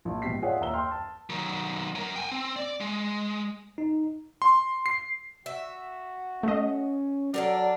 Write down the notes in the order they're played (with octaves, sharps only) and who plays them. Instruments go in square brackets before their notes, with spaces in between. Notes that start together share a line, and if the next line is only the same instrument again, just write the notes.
[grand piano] A#1
G#1 B2 G4 B6 C7
F4 G#4 C#5 D5 E5 F#5
D#2 E5 A#5 E6 G7
G5 C6 F6
A5
[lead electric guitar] D#3 F#3
F#3 A#4
G5 G#5
C4
D5
G#3
[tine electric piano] D#4
[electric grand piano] C6
C7
[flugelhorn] F#4 [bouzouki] E5
[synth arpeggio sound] A3 D#5 [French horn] C#4
[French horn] F#3 [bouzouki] D4 A4 A#4 [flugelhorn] D5